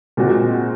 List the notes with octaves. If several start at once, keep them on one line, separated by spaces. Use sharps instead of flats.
A#2 G#3 C4 F#4